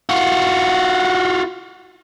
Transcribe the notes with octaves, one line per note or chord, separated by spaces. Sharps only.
F4 F#4